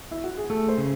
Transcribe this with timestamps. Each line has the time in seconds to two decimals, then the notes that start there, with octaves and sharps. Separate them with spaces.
0.11 E4
0.24 F#4
0.37 G#4
0.50 A3 A4
0.68 C5
0.78 C#3